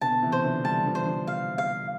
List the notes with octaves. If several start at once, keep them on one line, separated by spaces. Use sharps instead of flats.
B2 D3 A5
C3 E3
C5
D3 F3
E3 G3 A5
D3 F3
C5
D3 F3
F5
F5